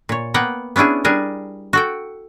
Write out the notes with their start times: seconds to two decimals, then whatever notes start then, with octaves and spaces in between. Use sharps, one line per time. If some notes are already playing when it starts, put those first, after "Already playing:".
0.09 A#2 C#5
0.34 A#3 B3 F#5 G5
0.76 B3 C#4 D4 E4 G#4
1.04 G3 D4 G#4 A#4
1.73 F#4 A4 G5